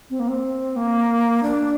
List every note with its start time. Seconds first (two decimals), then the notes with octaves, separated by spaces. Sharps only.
0.10 C4
0.20 A#3
0.28 C4
0.76 A#3
1.43 D4